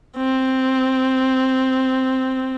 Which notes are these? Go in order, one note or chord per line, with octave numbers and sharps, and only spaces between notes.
C4